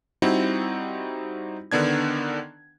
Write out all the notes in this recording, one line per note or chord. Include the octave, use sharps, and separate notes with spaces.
G3 C4 D#4 E4 F#4
D3 D#3 B3 D4 G#6